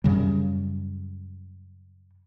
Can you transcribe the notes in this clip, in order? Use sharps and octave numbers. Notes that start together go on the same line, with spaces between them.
F#2 C#3 G3